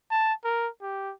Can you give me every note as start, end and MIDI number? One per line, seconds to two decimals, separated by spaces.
0.11 0.33 81
0.44 0.68 70
0.82 1.12 67